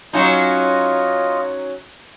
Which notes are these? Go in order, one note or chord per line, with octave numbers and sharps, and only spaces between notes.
F#3 C#4 D#4 F4 D#5